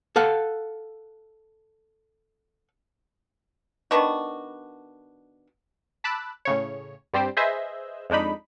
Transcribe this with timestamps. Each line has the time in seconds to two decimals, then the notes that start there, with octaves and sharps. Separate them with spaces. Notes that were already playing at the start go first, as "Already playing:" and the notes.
0.16 A4 F5 F#5
3.91 D#3 B3 D4 F#4
6.04 A5 B5 D6 E6 F#6
6.45 A2 C#3 C#5
7.14 G2 G3 C4 G4 C5
7.37 G#4 B4 C5 D#5 E5 E6
8.10 F2 G#3 D4 D#4 B5